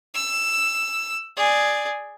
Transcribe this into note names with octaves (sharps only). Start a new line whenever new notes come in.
E6
G#4 D5